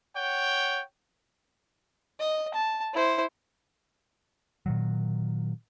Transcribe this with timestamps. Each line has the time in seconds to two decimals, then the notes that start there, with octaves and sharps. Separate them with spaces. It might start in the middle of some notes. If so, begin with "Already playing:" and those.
0.16 C#5 F#5 G5
2.19 D#5
2.54 A5
2.94 E4 C5
4.66 A#2 D#3 F#3